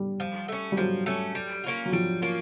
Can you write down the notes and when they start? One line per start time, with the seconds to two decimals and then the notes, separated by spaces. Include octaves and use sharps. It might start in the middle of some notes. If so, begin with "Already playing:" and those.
Already playing: G3
0.20 F3
0.48 A3 C#4
0.72 G3
0.77 F3 F#3
1.06 A3 C#4
1.35 G3
1.64 A#3 C#4 F4
1.86 F#3
1.92 F3 G3
2.22 A#3 C#4 F4